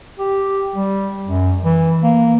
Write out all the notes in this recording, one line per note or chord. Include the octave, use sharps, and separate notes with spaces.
G4
G3
F#2
E3
A#3